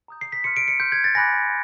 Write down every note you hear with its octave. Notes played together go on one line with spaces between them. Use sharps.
A#5 D#6 G6
C7
B6
C6 F6 C#7
D7
C#7
C6 F6 G6
G#6
A6
G#5 B5 D6 F#6 A#6